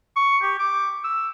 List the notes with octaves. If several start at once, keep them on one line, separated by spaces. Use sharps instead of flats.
C#6
G4
D6
E6